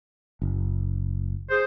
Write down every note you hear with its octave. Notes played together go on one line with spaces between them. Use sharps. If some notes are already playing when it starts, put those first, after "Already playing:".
F#1
G#4 C5